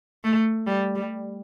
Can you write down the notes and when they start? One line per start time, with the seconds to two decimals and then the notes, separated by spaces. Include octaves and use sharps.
0.24 A3
0.67 G3
0.95 G3